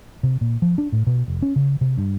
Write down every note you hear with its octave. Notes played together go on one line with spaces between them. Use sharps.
C3
A#2
F3
D4
A2
B2
F1
C#4
C#3
C3
G2